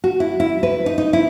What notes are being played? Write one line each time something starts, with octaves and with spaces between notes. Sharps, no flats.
F#4
E4
E4
B4
D#4
D#4
E4